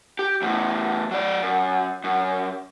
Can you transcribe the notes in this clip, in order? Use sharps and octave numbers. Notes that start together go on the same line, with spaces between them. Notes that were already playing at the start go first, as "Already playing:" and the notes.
G4
E2 A2
F#3 D5
F#2
F#2